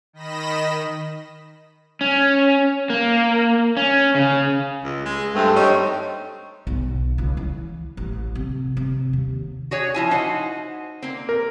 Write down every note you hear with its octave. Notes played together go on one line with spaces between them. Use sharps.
D#3 D#5 B5 A#6 E7
C#4
A#3
C#4
C#3
C#2
G#3
G2 A3 C4
G3 C4 D#4 C#5
B1
C#2
E3
A1
C3
C3
D#2
F#4 G#4 C#5
F3 E4 G#5
D#4 F#4 C5
A#3 C4
A#4